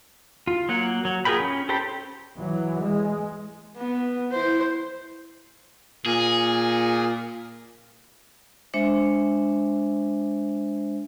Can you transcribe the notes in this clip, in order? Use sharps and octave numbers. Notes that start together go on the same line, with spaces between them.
F4
F#3 A#3 F#5
F#3
F4 G#4 A#4 G5 B5
C#4
G4 A4 C5 G5 B5
E3 F#3
G#3
B3
E4 C5
A#2 G#4
G#3 D4 C5 E5